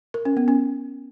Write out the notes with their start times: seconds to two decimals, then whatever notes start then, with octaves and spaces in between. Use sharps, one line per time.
0.14 A#4
0.25 C#4
0.37 B3
0.48 C#4